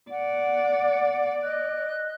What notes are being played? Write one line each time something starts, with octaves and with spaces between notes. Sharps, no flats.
D5 F#5
D#5 F#6